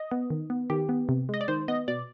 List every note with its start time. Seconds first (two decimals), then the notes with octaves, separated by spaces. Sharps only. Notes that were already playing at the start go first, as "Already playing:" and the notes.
Already playing: D#5
0.11 B3
0.30 D#3
0.50 B3
0.70 D#3 G4
0.89 B3
1.09 C3
1.29 G#3 D#5
1.41 D5
1.48 D#3 C5
1.68 B3 D#5
1.88 B2 D5